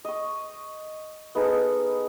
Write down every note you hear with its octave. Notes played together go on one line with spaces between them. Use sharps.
D#5 C#6
B3 D#4 G#4 A4